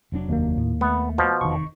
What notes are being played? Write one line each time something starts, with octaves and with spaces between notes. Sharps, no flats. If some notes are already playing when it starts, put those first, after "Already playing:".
F1 F#3 D4
D#2 A#3
A2
A3 B3
B2 F3
F1 E2 D#3 C#6